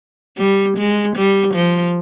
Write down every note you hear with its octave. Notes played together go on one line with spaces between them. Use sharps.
G3
G#3
G3
F3